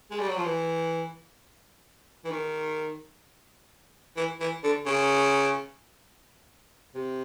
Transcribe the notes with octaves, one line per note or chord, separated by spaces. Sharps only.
G#3
G3
F#3
F3
E3
E3
D#3
E3
E3
D3
C#3
C3